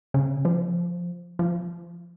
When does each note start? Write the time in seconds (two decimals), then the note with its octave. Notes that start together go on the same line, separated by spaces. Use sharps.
0.14 C#3
0.45 F3
1.39 F3